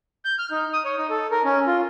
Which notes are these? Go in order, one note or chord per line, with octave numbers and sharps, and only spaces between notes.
G6
F6
D#4
D#6
C#5
D#4
A4
A#4
C#4
F4